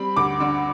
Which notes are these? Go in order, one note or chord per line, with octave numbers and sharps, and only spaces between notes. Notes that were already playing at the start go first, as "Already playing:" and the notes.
Already playing: G3 C4 B5
D2 D6
D3